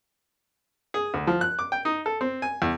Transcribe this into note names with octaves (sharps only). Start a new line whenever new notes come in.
G#4
D2
F3
F#6
D6
G5
D#4
A4
C4
G#5
E2